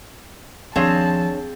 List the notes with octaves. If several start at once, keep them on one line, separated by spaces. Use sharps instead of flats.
D#2 F3 C4 D4 G#4 C#5 F5 A5